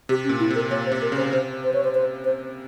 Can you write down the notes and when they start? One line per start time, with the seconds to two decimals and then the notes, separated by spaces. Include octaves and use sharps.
0.09 C3 G4
0.25 C#4
0.29 A#2
0.40 E4
0.50 C3
0.55 A#4
0.70 A#2 C#5
0.86 C5
0.92 C3
1.02 A#4
1.12 C#3
1.17 C5
1.32 C3 C5
1.64 C5
1.74 C#5
1.84 C5
1.95 C5
2.25 C5